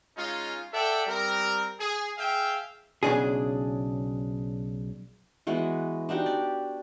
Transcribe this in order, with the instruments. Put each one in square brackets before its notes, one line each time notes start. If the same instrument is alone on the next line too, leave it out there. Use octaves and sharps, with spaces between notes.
[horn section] G#3 C#4 D#4 F4
A4 D5 E5 F#5 G5
G3 C4 A#4
G#4
G#4 E5 F5 G5
[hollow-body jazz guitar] B1 C#3 D4 G#4
[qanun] E3 G#3 B3 F#4
D4 D#4 F#4 G4
D5